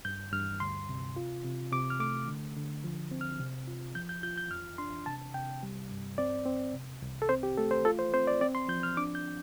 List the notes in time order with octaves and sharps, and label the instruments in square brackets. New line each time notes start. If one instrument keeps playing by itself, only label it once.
[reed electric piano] G2 G6
G2 F6
D2 C6
C3
F4
C3
C3 D6
F6
A3 D6
D3
D3
F3
C4
F6
C3
F4
F3 G6
G6
F4 G6
G6
F2 F6
D4 C6
C3 A5
C3 G5
G3
G2
C4 D5
C4
C3
C2
A4
C4 C5
G4
A3 A4
C5
F4 A4
C5
C4 C5
D5
C4 D5
C6
F3 G6
F6
D4 D6
G6